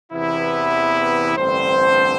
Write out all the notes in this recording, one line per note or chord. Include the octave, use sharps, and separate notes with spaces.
E2 C3 E3 B3 E4
A1 G2 D3 C4 C5